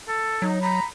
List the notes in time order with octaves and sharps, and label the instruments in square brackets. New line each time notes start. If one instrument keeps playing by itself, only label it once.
[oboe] A4
[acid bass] F#3 [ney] D#4
[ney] A#5 [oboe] B5